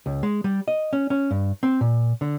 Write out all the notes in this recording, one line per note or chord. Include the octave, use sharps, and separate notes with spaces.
C#2
G#3
G3
D#5
C#4
C#4
G2
C4
A#2
D3